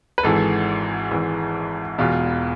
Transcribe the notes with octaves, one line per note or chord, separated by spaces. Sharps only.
B4
G#1 G#2 E3 A4
G#1 G#2 E3
E1 E2 B2 F4